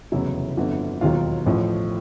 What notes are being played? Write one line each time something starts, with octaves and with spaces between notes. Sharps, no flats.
F1 E2 C#3 F#3 E4 E5
G1 F2 D3 F#3
E1 D#2 D#3 F#3 F4 F5
A1 A2 F3